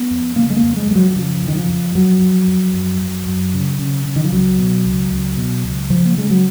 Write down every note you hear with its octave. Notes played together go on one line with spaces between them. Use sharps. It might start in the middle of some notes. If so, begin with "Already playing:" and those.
Already playing: B3
F2
C#3 A#3
G#3
A#3
F2
G#3
F2 G#3
F#3
F#3
C#3 F3
F2
D#3
F3
F2
F2 F#3
F2
F2
F#2
F#2
F#2
C#3
C#3
C#3
D#3
F3
C#2 F#3
B2
C#2
C#2
B2
C#2
C#3 F3
A#3
C#3 G#3
F#3